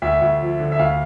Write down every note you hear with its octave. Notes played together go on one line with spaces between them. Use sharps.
D2 E5
D2
F3
D3
E5
D2 F5